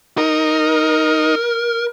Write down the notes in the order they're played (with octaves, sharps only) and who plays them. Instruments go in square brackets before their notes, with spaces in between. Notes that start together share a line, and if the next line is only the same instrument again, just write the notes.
[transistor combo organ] D#4 [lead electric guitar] A#4